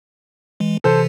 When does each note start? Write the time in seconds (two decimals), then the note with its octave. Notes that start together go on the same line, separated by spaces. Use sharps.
0.60 E3 G#3
0.84 C3 E3 A4 C5